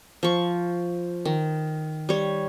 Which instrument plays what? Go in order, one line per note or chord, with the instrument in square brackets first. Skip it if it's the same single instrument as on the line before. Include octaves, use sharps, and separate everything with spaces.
[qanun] F3 C#6
D#3
G3 C#5